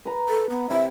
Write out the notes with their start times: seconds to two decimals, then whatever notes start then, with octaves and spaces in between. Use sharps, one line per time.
0.05 B4 A#5
0.29 A4
0.50 B3
0.70 C3 E4 E5